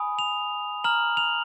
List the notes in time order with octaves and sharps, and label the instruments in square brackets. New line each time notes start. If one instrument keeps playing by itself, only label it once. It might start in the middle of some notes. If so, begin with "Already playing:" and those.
Already playing: [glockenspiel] G#5 B5 D#6
F7
A#5 F6 F#7
F7